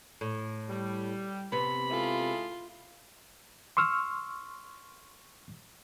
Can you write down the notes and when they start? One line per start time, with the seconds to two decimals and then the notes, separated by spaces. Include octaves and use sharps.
0.21 A2
0.69 G3
1.52 C3 B3 B5
1.91 G#3 E4 F4 A4
3.77 C6 C#6 E6 F6